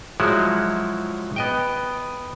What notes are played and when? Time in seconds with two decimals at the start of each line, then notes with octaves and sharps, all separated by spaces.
0.20 F3 F#3 G#3 E4 F#4
1.36 B3 D#5 G5